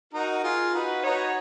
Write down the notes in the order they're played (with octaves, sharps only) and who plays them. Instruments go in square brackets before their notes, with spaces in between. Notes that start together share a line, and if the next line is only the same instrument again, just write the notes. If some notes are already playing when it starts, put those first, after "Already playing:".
[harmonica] D#4 F#4 [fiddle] A#4
[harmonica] F4 G#4
[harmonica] D#4 F#4 [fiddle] B4
[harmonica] D#4 F#4 [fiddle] C#5